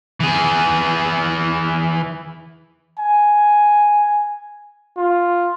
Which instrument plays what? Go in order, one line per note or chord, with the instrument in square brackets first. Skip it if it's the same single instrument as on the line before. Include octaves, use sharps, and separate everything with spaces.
[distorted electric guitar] E3 G#4
[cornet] G#5
F4